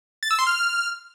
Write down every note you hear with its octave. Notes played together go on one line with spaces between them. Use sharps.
A6
E6
C6
F6